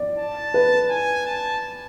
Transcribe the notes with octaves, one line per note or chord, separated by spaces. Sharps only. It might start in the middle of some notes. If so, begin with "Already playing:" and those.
Already playing: D5
A5
B4
G#5
A5